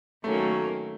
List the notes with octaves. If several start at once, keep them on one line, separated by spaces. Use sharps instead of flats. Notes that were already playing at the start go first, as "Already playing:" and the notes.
D#3 F#3 A3 A#3 C#4
A3